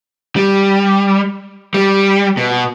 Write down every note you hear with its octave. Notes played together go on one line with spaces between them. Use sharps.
G3
G3
B2